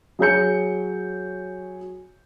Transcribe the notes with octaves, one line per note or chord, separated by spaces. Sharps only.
F#3 G#4 C#5 G6 C#7